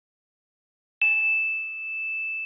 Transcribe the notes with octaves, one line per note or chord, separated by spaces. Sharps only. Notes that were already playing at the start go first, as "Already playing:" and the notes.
E7